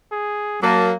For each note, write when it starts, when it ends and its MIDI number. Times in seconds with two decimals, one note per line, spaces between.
0.12 0.58 68
0.63 0.93 54
0.63 0.93 58
0.63 0.89 81